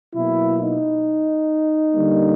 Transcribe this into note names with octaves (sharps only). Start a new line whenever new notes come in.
B2 F#3 A#3 E4
D#4
D3 G3 A#3